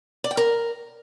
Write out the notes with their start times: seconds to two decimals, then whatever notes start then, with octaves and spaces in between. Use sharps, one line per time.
0.24 D5
0.31 G5
0.37 A#4